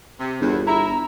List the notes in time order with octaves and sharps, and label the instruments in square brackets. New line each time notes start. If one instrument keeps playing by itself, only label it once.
[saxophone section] C3
[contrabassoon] G1 [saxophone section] E2
[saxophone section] E4 [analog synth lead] A#5